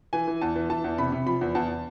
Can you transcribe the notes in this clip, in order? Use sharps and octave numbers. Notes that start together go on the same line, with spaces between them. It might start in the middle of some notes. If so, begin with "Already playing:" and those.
E3 G#5
E3
E2 A5
E3
E3 A5
E2
C3 B5
C3
F3 B5
E2
E2 A5